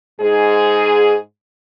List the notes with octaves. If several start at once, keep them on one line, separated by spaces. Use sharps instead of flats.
G#2 G#4